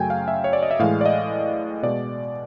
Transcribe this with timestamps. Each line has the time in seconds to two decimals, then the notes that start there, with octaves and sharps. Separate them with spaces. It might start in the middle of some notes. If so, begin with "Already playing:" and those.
Already playing: F#2 C#3 F#3 A3 G5 G#5
0.10 F5
0.28 E5
0.44 C#5
0.53 D5
0.63 D#5
0.71 E5
0.79 A2 E3 G#3 F5
1.01 D5
1.06 D#5
1.83 B2 G#3 D5